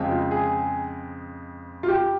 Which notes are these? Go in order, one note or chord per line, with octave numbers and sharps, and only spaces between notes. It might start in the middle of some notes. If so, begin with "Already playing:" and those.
Already playing: F2 C#3 G#3 C4
F4
G#4
F4
G4